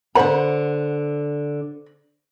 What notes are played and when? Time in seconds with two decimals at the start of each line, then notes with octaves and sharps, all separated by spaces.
0.15 D3 C5 F#5 B5